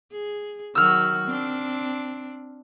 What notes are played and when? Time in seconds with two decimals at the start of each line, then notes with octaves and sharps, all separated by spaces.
0.12 G#4
0.75 D#3 F#3 F#4 E6 F6
1.27 C4 D4